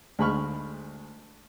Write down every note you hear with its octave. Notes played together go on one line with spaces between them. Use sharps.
D2 G#3 B5 C#6 F6